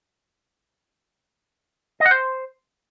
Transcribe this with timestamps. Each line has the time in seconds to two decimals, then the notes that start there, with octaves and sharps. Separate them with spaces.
2.00 D#5
2.06 F#5
2.11 C5